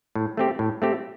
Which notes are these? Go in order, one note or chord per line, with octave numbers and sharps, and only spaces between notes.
A2
A3 C4 G4
A2
A3 C4 G4